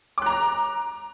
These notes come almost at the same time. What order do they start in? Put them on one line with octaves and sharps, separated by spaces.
D6 F#6 A#5